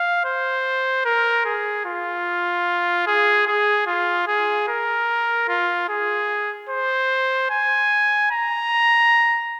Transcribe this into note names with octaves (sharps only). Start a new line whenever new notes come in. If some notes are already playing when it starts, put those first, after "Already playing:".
Already playing: F5
C5
A#4
G#4
F4
G#4
G#4
F4
G#4
A#4
F4
G#4
C5
G#5
A#5